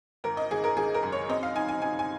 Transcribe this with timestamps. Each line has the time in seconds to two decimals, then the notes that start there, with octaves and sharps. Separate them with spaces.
0.24 G#1 A#4
0.37 D#5
0.51 G#1 G#4
0.64 A#4
0.76 G#1 G#4
0.94 A#4
1.03 F#2
1.12 C#5
1.29 C4 D#5
1.43 F5
1.56 D#4 G#5
1.69 G#5
1.82 D#4 G#5
1.99 G#5